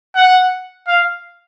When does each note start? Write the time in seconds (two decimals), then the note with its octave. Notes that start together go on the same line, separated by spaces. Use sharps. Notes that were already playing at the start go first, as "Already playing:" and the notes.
0.15 F#5
0.88 F5